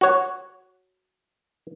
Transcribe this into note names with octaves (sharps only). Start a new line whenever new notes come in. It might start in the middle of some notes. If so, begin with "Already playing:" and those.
F#4 C#5